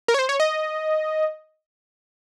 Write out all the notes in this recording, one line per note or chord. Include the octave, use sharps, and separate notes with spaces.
A#4
C#5
C5
C#5
D#5